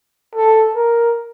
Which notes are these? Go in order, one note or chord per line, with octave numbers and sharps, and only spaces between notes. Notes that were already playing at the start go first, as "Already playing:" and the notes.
A4
A#4